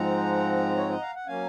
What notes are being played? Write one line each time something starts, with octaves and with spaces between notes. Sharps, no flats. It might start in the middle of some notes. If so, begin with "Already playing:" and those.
Already playing: G#2 F3 G#3 C4 F#5 A#5
C#5
D#5
F5
F#5
F#3 A#3 C#4 F5 G#5